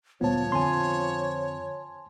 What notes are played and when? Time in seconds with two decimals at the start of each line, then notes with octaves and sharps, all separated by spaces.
0.21 D2 A#2 F3 G3 B3 C#5 A5
0.52 F2 D3 C4 G#5 A5 C6